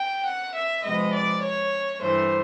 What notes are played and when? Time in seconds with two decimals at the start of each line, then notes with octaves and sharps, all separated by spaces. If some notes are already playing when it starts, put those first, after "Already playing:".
Already playing: G5
0.26 F#5
0.55 E5
0.84 C3 F3 G#3 B3 D#5
1.12 D5
1.43 C#5
2.01 G2 E3 A3 C5